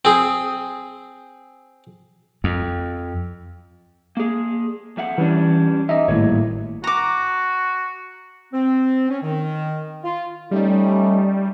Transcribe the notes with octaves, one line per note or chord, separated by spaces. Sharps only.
C4 G#4
F2
A#3 G#4
F2 E5 F#5
E3 G3 C#4 D4
E2 D#4 D#5 E5
G#1 A2 G3 A#3 C#5
F#4 A#5 D6
C4
C#4
D#3
F4
G3 A3 C#4 D#4